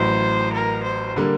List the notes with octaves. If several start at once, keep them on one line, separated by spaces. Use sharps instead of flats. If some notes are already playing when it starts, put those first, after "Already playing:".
Already playing: A1 A2 F#3 C5
A#4
C5
D3 G3 A#3